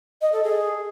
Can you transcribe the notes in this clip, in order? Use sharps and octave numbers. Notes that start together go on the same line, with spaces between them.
D#5
A4
G#4